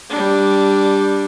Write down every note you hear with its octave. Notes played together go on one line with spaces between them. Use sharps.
G3 D4